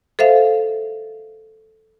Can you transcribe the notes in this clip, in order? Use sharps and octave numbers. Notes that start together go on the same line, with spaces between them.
A4 C5 E5 F5